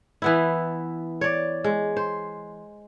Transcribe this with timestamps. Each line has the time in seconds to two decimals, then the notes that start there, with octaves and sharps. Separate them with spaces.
0.22 E3 B3 E4
1.21 C#5 D5
1.64 G#3
1.97 C5